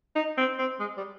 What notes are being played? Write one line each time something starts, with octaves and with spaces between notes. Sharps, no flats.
D#4
C4
C4
G#3
G3